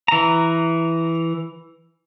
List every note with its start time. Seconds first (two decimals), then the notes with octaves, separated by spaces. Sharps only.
0.08 E3 A#5